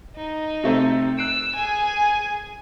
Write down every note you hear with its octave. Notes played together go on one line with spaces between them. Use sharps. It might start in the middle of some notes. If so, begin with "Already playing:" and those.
D#4
C3 A3 C4
E6 F#6 C7 D7
G#4 G#5